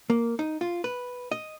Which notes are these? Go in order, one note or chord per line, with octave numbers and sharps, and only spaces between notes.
A#3
D#4
F4
B4
D#5